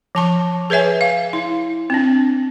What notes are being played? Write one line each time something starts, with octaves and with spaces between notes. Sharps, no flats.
F3 A5 C#6
G#4 B4 C#5 E5 G#5
F5
E4
C4 D4